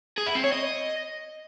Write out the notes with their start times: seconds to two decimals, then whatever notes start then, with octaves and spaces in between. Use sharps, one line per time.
0.18 G#4
0.26 E4
0.35 C4
0.44 C#5
0.53 D#5